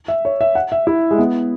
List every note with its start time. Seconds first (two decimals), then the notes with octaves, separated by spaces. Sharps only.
0.08 E5
0.25 C#5
0.41 E5
0.55 F#5
0.72 E5
0.87 E4
1.11 G#3
1.19 B3